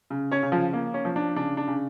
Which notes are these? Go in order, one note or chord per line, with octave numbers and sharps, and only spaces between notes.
C#3
C#4 C#5
C#3
F3 F4
A#3
C#4
F3
D4
C#3 D4
D4
C#3